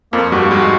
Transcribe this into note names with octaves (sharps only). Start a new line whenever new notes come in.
F2 F3 A#3
G2 G3 F#4
G#2 G#3 F#4